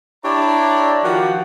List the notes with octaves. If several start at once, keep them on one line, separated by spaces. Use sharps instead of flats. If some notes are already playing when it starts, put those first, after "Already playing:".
D4 E4 G4 C#5 D5 A#5
D#3 F3 F#4 G4 F#5